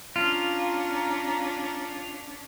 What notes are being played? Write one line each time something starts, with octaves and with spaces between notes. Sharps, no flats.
C#4 D4 F4 A#5